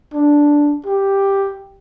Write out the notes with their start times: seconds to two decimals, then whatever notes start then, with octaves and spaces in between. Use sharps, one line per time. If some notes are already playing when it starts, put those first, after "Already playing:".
0.14 D4
0.86 G4